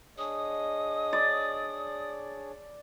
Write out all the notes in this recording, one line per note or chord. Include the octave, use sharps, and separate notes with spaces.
D4 G#4 C#5 D#5 D#6
D5